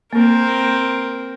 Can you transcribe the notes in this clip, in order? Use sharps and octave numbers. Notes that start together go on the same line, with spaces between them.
A#3 C4 A#4